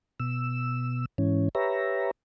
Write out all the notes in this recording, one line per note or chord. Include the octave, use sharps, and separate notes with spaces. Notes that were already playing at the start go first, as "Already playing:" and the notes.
B2 E6
G#2 E3 C#4
G4 B4 C#5 E5 A#5